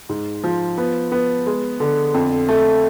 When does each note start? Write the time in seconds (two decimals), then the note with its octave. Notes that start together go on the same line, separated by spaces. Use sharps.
0.09 G#2
0.44 F3
0.78 B3
1.12 B3
1.46 G#3
1.80 D3
2.14 F2
2.49 A3